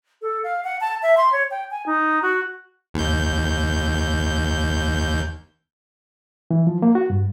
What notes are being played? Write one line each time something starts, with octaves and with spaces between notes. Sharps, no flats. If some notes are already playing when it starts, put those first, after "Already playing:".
A4
F5
F#5
A5
E5
C6
C#5
G5
G#5
D#4
F#4
D#2 G6
E3
F3
A#3
F#4
G2